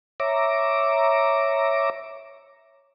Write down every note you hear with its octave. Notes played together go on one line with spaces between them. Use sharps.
C#5 E5 A#5 D6